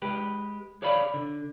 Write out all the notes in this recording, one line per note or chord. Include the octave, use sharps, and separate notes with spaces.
G#3 G4 B4
G#4 C#5 D5 F5 B5
D3